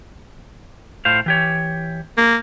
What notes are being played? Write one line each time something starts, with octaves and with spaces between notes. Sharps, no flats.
A2 C5 F5
E3 G4 C#5
A#3